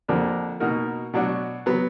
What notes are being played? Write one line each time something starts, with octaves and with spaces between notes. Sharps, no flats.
F2 D3 F3 A#3 D4
B2 A#3 D#4 F#4 A#4
B2 F#3 D4 F#4
F#3 B3